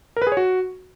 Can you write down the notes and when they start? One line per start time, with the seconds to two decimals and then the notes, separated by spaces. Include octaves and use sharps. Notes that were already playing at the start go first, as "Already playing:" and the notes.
0.17 A#4
0.22 B4
0.27 G#4
0.32 C#5
0.37 F#4